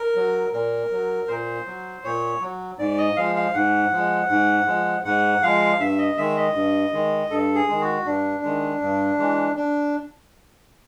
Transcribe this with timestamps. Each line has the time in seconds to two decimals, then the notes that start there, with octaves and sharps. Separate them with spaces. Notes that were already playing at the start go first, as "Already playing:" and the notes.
Already playing: A#4
0.16 F#3
0.53 A#2 A#4
0.91 F#3
1.28 A#2 C5
1.66 F#3
2.04 A#2 C#5
2.41 F#3
2.78 G#2 D5
2.98 D#5
3.16 F3 G#3 F5
3.35 F5
3.54 G#2 F#5
3.92 F3 G#3
4.29 G#2
4.66 F3 G#3
5.04 G#2 F#5
5.43 F3 G#3 F5
5.79 G2 E5
5.98 D#5
6.17 D#3 G#3 E5
6.36 D#5
6.55 G2
6.92 D#3 G#3
7.30 G2 A4
7.55 G#4
7.68 D#3 G#3
7.81 F#4
8.05 G2 D4
8.43 D#3 G#3
8.81 G2
9.18 E3 G#3
9.56 D4